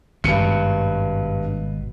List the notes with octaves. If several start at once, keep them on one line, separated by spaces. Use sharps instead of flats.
G#1 G2 B2 C#7